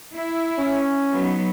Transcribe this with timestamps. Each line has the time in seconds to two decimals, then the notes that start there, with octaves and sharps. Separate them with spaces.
0.15 E4
0.58 C#4
1.12 F#3 B3 D#4